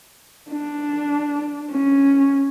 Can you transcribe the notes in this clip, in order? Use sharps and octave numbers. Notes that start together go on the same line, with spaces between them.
D4
C#4